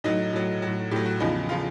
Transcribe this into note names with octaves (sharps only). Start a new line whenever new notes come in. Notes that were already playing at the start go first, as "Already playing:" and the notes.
A2 F#3 D#4
A2 F#3
A2 F#3
A2 F#3 G4
F#4
E2 C#3 F3 D#4
C#3 F3 F4